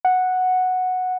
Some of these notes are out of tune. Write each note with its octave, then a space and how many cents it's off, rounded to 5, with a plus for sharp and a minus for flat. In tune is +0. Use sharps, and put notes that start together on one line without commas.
F#5 -5